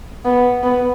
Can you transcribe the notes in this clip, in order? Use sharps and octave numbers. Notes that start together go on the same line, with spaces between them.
B3
B3